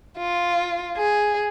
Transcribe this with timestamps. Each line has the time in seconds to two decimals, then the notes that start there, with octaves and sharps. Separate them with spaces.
0.17 F4
0.97 G#4